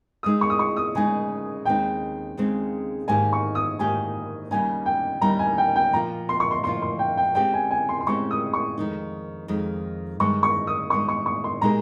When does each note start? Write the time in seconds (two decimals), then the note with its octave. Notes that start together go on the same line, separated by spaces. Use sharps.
0.23 C#3 G#3 D#4 D#6
0.41 C#6
0.50 D#6
0.59 C#6
0.77 D#6
0.95 C#3 G#3 D#4 G#5
1.65 D#2 C#3 G#3 C4 D#4 G5
2.37 D#2 C#3 G#3 C4 D#4
3.08 G#2 D#3 A#3 D#4 G4 G#5
3.33 C#6
3.55 D#6
3.79 G#2 D#3 A#3 D#4 G4 G#5
4.51 D#2 C#3 G3 A#3 D#4 G#5
4.86 G5
5.21 D#2 C#3 G3 A#3 D#4 A#5
5.39 G#5
5.58 G5
5.76 G5
5.93 A#2 F3 A#3 F4 A#5
6.29 C6
6.40 C#6
6.51 C6
6.64 A#2 F3 A#3 F4 C6
6.82 C6
6.99 G5
7.17 G5
7.35 C#3 G#3 C4 G4 G5
7.54 G#5
7.71 G#5
7.89 C6
8.01 C6
8.07 C#3 G#3 C4 G4 C#6
8.31 D#6
8.53 C#6
8.78 F2 D#3 G#3 D#4
9.48 F2 D#3 G#3 D#4
10.20 G2 D#3 G#3 C#6
10.43 C#6
10.67 D#6
10.90 G2 D#3 G#3 C#6
11.08 C#6
11.26 C#6
11.44 C6
11.61 A#2 G#3 D#4 G4 A#4 A#5